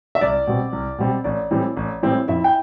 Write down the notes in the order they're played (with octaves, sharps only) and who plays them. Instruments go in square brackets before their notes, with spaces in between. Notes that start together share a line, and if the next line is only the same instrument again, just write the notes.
[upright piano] E5
[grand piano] C2 [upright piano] D5
[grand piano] B2 G3 C4
C2
B2 G3 C4
[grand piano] A1 [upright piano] D5
[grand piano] A2 E3 G3 C4
A1
A2 E3 G3 C4
[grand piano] F2 [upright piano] E4 E5
[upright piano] G5